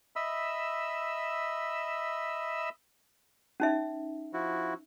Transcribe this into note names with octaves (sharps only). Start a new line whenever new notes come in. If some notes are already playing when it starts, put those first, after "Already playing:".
D#5 E5 B5 E6
C#4 D#4 E5
F3 E4 F#4